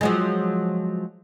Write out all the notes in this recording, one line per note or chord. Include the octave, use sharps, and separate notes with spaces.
F3 F#3 G#3